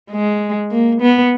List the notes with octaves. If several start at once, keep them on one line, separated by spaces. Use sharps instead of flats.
G#3
A#3
B3